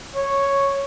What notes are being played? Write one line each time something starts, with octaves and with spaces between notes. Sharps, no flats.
C#5